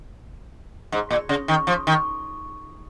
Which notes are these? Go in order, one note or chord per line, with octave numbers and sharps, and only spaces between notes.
G#2
A#2
C#3
D#3
F3
D#3